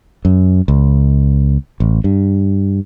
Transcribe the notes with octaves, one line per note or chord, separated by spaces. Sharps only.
F#2
C#2
A1
G2